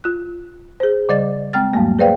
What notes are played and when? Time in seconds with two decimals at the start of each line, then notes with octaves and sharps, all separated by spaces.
0.04 F4 F#6
0.80 G#4 C5
1.09 C#3 G3 D5 D#5 A6
1.53 G#3 C4 G5 F6 A6
1.73 E2 G#2 F#3 G3 A3 A#3
1.99 G#4 B4 C5 D5 F5 G5